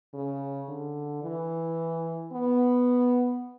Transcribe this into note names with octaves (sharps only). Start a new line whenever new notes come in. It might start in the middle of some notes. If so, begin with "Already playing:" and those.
C#3
D3
E3
B3